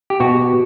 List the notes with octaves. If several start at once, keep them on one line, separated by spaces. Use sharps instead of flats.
G4
B2 F#4